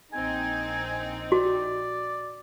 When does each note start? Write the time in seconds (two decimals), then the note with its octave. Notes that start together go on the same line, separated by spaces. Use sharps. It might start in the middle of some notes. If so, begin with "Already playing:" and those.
0.13 A#1 C4 D#4 G#5
1.32 F#4 D5